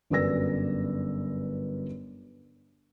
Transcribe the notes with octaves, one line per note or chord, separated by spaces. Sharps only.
G1 F#2 B4 D5 E6 A#6